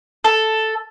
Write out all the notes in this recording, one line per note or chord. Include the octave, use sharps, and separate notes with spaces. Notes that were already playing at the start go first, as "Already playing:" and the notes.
A4